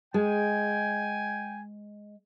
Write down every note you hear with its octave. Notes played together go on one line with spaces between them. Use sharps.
G#3 G5 G#5